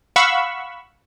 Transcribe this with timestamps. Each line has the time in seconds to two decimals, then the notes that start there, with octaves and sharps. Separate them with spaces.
0.16 F5 F#5 B5 C#6 E6